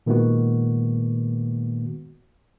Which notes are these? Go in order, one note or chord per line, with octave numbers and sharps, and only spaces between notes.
A#2 D#3 G#3 A#3 B3 F#4